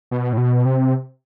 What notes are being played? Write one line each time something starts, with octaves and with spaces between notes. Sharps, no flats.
B2
A2
B2
C3